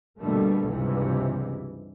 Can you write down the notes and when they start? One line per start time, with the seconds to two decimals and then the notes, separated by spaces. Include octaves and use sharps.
0.20 B2 D3 G3 A3 A#3
0.69 C#2 G2 C3 E3 G#3